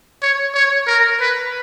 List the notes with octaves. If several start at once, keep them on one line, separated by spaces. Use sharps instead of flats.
C#5
C#5
A#4
B4